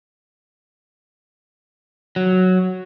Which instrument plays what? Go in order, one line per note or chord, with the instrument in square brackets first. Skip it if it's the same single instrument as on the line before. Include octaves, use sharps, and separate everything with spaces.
[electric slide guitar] F#3